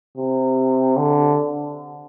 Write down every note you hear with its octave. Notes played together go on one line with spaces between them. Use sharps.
C3
D3